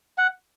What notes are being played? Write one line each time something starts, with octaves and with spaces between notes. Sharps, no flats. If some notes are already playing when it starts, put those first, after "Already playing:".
F#5